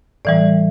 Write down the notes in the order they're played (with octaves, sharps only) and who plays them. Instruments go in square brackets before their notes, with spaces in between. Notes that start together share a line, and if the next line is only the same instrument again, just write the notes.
[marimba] A2 E3 G3 D5